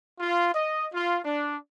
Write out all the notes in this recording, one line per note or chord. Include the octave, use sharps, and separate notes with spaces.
F4
D#5
F4
D4